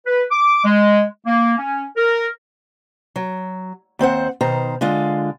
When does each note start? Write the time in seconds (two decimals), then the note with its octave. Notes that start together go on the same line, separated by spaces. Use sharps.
0.06 B4
0.31 D6
0.65 G#3
1.26 A#3
1.58 C#4
1.97 A#4
3.16 F#3
3.99 D#2 C4 C5 F#5
4.41 B2 D#3 C5 A#5
4.81 D3 G#3 F4